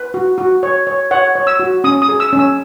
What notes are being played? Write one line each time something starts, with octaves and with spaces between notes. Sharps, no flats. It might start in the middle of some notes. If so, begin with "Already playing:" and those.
Already playing: B4
F#4
F#4
C#5
C#5
C#5 F#5
C#5
E6
F#4
C#4 D#6
D#6
G#4
E6
C#4
E6